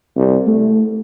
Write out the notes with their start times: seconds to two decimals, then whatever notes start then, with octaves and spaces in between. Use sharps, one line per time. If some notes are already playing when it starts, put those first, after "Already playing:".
0.16 C2
0.47 A3